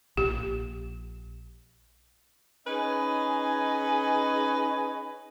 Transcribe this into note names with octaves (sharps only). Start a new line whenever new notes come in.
A#1 A#2 G4
C#4 D#4 G#4 B4 D#5 G#5